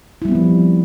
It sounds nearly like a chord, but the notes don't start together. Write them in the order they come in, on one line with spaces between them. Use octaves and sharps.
E4 G3 B3 C4 F3